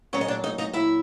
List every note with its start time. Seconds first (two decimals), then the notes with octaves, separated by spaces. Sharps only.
0.13 A#2 F#3 C#4 C#5
0.21 D#5
0.28 D4 D5
0.44 D#4 D#5
0.58 D#4 D#5
0.73 E4 E5